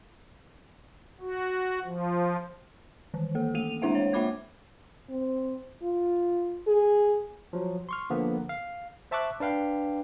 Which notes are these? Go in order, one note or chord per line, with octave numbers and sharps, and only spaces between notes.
F#4
F3
D#3 E3
A#3 A4
A3 A#3 D#7 F7
G#3 D4 E4 C5 E5 F#5
C#5
A#3 F4 E5 B5 D6 G#6
C4
F4
G#4
F3 F#3
C6 C#6 F6
D3 F3 A#3 B3
F5
C5 E5 A5 C#6 D6 F#6
D4 B4 F5 G5